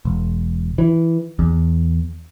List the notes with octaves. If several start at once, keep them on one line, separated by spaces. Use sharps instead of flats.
E1
E3
E2